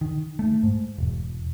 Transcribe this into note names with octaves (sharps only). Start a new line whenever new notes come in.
D#3
A3
G#2
E1